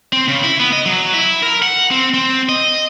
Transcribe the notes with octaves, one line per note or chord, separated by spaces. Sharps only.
C4
C#3
E4
B3
D#5
F#3
E4
A#4
F#5
C4
C4
D#5